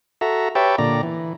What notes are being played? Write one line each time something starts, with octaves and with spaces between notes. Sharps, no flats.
F#4 A4 E5 A#5
G4 B4 C#5 E5 G5 A5
A#2 D3 D5 A#5
E3